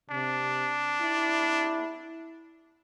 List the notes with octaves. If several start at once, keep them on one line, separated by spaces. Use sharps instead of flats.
C3 D4
E4